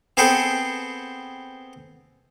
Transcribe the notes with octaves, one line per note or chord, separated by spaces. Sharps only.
B3 C4 G#4 A4 B4 G5